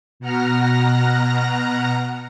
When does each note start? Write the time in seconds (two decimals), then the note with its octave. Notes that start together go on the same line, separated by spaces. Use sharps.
0.20 B2 F#5 A#5 F6 A#6